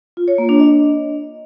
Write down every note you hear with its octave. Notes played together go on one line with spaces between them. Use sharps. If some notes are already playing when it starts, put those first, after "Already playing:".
F4
C#5
A#3
D4
D#5